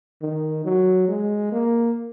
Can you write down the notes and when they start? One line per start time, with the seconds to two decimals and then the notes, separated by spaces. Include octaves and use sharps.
0.22 D#3
0.65 F#3
1.08 G#3
1.52 A#3